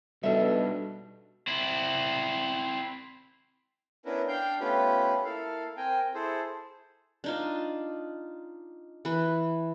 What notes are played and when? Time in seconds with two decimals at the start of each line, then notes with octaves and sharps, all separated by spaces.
0.23 B2 G3 D4 D#4 A4 E5
1.47 C4 E4
4.06 B3 C#4 D4 E4 A#4 B4
4.28 D4 F5 G5 G6
4.60 A3 B3 C#4 F4 G4 B4
5.24 A#3 E4 A4 F5
5.77 C4 A#4 G5 G#5
6.14 E4 G#4 A4 C5
7.24 D4 D#4 F4
9.05 E3 B4